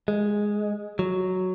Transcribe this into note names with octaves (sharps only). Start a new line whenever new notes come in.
G#3
F#3